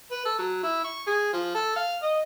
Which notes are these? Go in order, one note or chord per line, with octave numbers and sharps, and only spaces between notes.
B4
A4
F#3
E4
C#6
G#4
F3
A4
F5
D#5